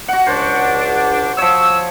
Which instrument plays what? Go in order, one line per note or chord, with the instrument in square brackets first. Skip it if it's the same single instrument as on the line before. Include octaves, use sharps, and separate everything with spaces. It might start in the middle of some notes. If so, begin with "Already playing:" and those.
[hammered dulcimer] F#4 F#5
[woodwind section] C#2 D4 [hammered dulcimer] C5
[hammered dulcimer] F3 C#5 [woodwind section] E6